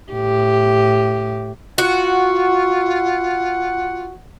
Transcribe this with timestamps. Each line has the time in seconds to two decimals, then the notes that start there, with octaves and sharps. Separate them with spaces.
0.12 A2 G4
1.78 F4 F#4 F#5